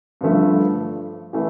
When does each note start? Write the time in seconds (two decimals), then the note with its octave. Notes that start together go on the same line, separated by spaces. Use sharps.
0.21 G2 D3 F3 A3
1.33 E3 A3